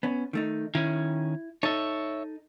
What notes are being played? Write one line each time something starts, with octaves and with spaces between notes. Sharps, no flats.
B3 C#4
D#3 A3 D#4
D#3 C#4 E4
D#4 A4 C#5 E5